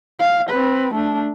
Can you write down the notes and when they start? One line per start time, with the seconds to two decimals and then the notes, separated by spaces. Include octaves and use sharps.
0.20 F5
0.50 C4 B4
0.94 A3 D4